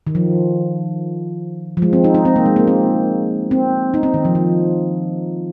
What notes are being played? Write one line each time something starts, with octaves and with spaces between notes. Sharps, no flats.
D#3
F3
F3
G#3
C4
D#4
D#4
C4
A#3
G#3
A#3
C4
C4
D#4
C4
D#3
F3
F3